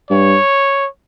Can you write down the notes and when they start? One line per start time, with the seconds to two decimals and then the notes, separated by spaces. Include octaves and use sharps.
0.10 G2 C#5